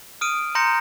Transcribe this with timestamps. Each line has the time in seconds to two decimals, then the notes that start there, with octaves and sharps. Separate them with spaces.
0.21 D#6 F6 D7 D#7
0.55 A#5 C6 G6 A#6 C#7